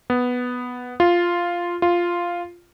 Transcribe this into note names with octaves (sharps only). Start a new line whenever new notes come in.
B3
F4
F4